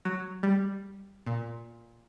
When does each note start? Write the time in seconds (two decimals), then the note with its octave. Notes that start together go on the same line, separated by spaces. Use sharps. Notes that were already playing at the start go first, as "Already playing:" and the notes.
0.05 F#3
0.43 G3
1.26 A#2